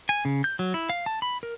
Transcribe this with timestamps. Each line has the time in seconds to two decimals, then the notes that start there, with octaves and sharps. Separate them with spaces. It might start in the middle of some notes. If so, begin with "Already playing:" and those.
0.09 G#5
0.25 C#3
0.44 G6
0.59 F#3
0.74 E4
0.89 F5
1.06 A5
1.22 B5
1.43 A#4